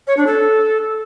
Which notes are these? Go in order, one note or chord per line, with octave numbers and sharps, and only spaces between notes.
C#5
D4
A4